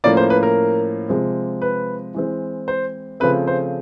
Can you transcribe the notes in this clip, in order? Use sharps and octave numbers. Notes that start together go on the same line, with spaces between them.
A2 F3 A#3 C#4 D5
C5
B4
A#4
C3 F3 G#3 C4
B4
E3 G#3 C4
C5
C#3 F3 A3 C4 B4
C5